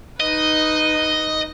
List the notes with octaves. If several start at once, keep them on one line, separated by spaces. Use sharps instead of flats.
D#4 B4 D#5